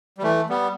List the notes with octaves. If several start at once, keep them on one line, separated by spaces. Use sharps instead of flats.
G3
E3 A3
G3 B3